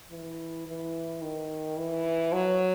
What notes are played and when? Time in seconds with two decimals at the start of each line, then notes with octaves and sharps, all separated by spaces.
0.10 E3
0.66 E3
1.22 D#3
1.77 E3
2.32 F#3